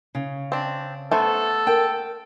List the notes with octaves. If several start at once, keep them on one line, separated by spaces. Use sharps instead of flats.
C#3
C4 D4
A3 B3 A4 C5
A#4 G5